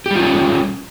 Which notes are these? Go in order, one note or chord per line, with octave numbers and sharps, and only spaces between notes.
G3 C#4 F4 G4